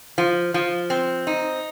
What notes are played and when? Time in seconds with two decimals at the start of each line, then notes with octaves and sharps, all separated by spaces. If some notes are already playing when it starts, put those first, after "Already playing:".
0.18 F3
0.54 F3
0.90 C4
1.27 D#4